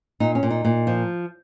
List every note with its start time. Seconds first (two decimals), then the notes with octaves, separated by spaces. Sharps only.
0.20 A#2 D#4
0.35 C#4
0.43 A#2
0.51 D#4
0.65 A#2
0.87 F3